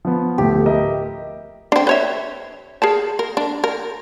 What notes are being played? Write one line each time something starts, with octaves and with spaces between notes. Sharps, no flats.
F3 B3
D1 A3 G4
A#4 D#5 E5
C4 D4
B4 C#5 E5
G#4 A#4 A5
A#4
D4
A#4